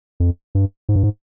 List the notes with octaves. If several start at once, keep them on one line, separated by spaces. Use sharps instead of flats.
F2
G2
G#2
G2
G#2